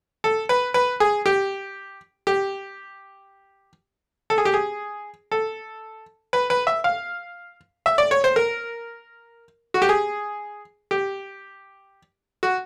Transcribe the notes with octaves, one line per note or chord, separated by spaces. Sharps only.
A4
B4
B4
G#4
G4
G4
A4
G#4
G4
G#4
A4
B4
B4
E5
F5
E5
D5
C#5
C5
A#4
F#4
G4
G#4
G4
F#4